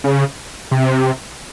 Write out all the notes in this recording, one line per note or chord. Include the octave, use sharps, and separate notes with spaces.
C#3
C3